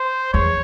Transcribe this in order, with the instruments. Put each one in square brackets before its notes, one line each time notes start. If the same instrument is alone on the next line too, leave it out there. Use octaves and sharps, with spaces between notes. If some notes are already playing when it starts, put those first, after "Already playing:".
Already playing: [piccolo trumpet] C5
[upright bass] E2 [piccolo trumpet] C#5